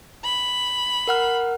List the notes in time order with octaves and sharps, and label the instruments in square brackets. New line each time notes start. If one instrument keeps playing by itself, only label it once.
[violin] B5
[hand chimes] A#4 F#5 F6